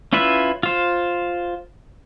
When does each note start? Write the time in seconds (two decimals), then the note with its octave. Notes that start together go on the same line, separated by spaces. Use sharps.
0.13 C#4 E4 F4 B4 E5
0.63 F4 C5